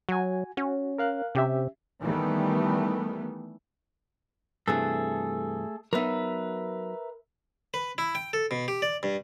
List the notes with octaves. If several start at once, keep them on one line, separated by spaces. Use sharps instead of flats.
F#3 F#4 G#5
C#4 F#4
A#4 F5 F#6
C3 C#4 G4 E5
D#3 E3 G3 A3 B3
G2 C3 E3 A3 G#4 A4
F#3 B3 D#4 A#4 B4 E5
B4
E4
G5
A4
B2
G4
D5
G2